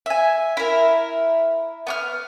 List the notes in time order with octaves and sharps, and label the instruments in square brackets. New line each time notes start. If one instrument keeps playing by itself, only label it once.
[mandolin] E5 G#5
E4 A#4
B3 D6 F6